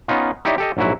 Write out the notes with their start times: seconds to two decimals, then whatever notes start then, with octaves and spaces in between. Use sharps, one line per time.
0.08 B3 C#4 D#4 F4
0.45 D#4 E4 G4 C#5 D5 E5
0.58 G4 A4 D#5
0.77 A#1 G#2 F#3 E4 F#4